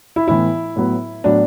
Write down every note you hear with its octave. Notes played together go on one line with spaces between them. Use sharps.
E4
A2 E3 B3 E4
A2 F#3 B3
A2 F#3 B3 D4